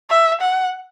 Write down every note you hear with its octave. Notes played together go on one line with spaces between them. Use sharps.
E5
F#5